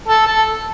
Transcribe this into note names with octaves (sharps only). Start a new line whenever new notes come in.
A4
A4